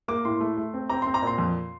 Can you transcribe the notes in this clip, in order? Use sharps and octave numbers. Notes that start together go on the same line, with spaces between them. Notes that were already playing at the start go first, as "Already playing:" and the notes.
A#3 D6
A2 C6
A3
A3
C4
C4 A#5
C4 C6
A#5
A#2 C6
F2